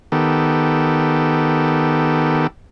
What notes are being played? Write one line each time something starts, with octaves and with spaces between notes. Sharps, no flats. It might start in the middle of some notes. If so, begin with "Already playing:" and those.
D#3 B3 G4 A4